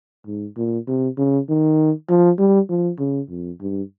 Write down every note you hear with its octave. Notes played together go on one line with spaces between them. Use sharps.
G#2
A#2
C3
C#3
D#3
F3
G3
F3
C#3
F2
G2